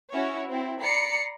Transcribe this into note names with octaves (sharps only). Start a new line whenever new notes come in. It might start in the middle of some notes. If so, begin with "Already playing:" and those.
C#4 E4 F#4 C#5
C4 E4
D5 A#5 B5 C7 C#7